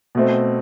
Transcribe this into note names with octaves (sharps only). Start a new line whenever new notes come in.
B2 A3 C4